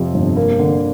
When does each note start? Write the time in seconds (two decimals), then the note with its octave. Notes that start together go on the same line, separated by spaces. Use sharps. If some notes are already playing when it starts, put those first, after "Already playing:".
Already playing: F2 C3 F3
0.14 G1
0.37 A#3
0.59 D3